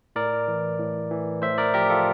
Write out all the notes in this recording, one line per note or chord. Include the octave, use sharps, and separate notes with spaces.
A2 A#4 D5
E3
A2
E3
A2 C5 E5
A#4 D5
F3 G4 A#4
F4 A4